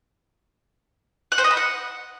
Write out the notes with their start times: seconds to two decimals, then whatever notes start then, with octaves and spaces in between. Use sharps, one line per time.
1.32 F#5
1.38 C5
1.44 D#5
1.51 B5
1.57 F#5